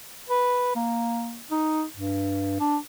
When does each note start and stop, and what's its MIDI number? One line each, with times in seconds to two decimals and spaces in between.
0.30 0.73 71
0.76 1.42 58
1.51 1.84 63
1.97 2.57 43
2.60 2.77 62